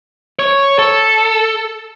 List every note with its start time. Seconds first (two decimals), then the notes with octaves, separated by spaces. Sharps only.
0.39 C#5
0.79 A4